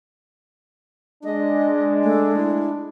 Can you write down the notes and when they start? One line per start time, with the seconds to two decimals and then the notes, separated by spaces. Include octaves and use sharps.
1.24 G#3 D4 D#5
2.04 A3
2.36 E4